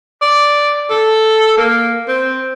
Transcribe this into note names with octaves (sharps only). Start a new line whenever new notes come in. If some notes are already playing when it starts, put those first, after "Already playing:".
D5
A4
A#3
C4